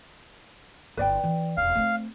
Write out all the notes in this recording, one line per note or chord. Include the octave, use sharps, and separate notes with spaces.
G1 E4 B4 D5 G5
E3
E1 C#2 F5
A3 C4